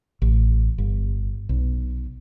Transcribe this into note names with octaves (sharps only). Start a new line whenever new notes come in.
A1
G1
B1